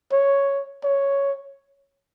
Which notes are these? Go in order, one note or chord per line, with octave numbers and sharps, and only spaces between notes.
C#5
C#5